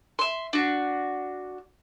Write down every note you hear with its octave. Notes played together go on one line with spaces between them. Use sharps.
E5 C6
D4 F#4